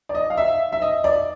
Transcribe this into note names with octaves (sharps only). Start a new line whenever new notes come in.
D5
D#5
F5
E5
E5
D#5
D5